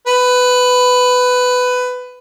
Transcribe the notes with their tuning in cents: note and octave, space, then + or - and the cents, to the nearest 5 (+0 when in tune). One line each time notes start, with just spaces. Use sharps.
B4 +15